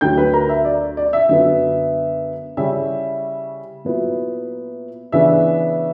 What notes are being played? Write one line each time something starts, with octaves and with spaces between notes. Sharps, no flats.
D2 D3 F#3 G5 G6
B4 B5
A#4 A#5
E5
D5
D5
E5
F#2 D3 F#3 B3 E5
C#3 G3 C#4 E4 E5
A#2 F#3 B3 E4
C#3 E3 B3 D4 E5